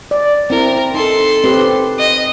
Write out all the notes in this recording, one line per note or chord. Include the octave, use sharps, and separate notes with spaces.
D5
C4 E4 A#4
D#4 A4 C6
C4 G4 B4
D#5